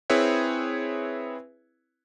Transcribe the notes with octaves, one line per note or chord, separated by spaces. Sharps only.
C4 E4 G#4 B4 C#5 E5